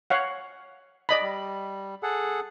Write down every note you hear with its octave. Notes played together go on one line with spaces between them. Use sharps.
C#5 F5 F#5
D5 D#5 B5
G3
G#4 A4 F#5